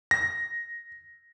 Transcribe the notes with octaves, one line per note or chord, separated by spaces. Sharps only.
A#6